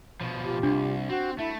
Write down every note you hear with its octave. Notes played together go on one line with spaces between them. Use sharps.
B2 F3
F4 G4
C2 D4
C4 F#4
A3 E4 E5